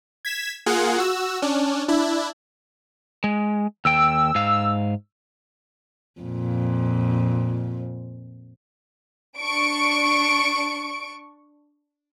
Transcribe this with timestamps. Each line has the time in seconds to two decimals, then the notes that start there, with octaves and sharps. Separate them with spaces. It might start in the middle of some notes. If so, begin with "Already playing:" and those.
0.25 G#6 B6 E7
0.66 A#3 F4 G#4 F#5
0.98 F#4 E6
1.42 C#4 D4
1.88 D4 E4
3.24 G#3
3.85 D#2 G5 E6
4.35 G#2 F5
6.21 F2 A#2
9.39 D4 C#6 D7